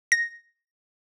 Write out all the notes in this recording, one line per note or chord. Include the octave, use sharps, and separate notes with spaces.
A#6